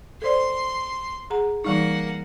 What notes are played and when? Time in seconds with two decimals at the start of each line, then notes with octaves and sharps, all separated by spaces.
0.22 A4 C5 D5 C6
1.30 G#4 F#5 A#5
1.64 E3 G3 A#3 D#4 F#5